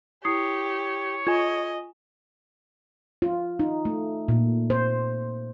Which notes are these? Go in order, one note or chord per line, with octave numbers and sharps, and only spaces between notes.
E4 G4 C#5 D#6 C7
F4 D#5 G#5 G#6
F4
D#4
A3
A#2
C5